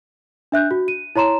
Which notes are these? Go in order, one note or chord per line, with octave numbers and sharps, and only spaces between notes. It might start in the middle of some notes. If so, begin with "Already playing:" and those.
D4 E5 F#6 G6
F#4
D#7
E4 C#5 A#5 C6 E7